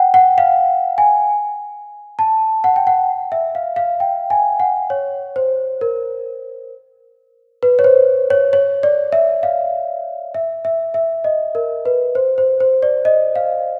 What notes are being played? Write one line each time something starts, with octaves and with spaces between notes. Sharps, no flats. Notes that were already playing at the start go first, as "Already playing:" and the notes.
Already playing: F#5 G5
F#5
F5
G#5
A5
F#5
G5
F#5
E5
F5
F5
G5
G#5
F#5
C#5
C5
A#4
B4
C#5
C5
C#5
C#5
D5
E5
F5
E5
E5
E5
D#5
A#4
B4
C5
C5
C5
D5
D#5
F5